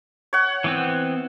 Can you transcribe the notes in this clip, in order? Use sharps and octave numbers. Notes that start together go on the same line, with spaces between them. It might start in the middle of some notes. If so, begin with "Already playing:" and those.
C#5 F#5
E3 B3 C4